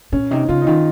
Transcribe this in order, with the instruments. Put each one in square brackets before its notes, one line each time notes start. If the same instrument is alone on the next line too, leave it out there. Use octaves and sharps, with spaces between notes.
[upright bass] A#2 [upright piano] C#4
[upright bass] C3 [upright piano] D#4
[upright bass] C#3 [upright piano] F4
[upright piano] D#4
[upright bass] D#3 [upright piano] F4